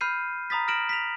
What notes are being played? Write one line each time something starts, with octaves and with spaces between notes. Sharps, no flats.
B5 F6 G6 C7 D#7
A#5 B5 D#6 A6 B6
F6 A#6 D7 E7 F#7
B6 F7